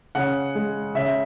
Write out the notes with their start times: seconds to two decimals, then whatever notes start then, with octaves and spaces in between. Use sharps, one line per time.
0.15 C#3 F#5
0.55 G#3
0.95 C#3 E5